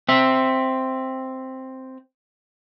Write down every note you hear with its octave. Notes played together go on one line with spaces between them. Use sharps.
C4 E5